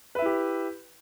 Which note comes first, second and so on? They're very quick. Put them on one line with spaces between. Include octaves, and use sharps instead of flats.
B4 E5 E4 G4